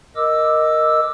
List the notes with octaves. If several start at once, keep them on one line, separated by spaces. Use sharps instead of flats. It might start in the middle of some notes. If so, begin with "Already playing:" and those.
A#4 D#5 D6 E6